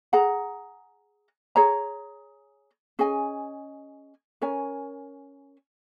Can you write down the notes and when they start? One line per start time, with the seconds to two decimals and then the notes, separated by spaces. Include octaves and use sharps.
0.13 G#4 F#5 A#5
1.56 G#4 C#5 A#5
2.99 C#4 G#4 D#5 G#5
4.42 C#4 A#4 C#5 G#5